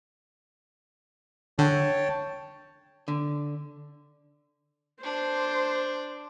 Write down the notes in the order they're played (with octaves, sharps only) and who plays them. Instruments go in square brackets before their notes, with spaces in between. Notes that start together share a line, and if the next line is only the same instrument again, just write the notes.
[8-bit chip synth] D3 [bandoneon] C#5 G5 A5
[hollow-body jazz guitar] D3
[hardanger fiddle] D4 [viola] C5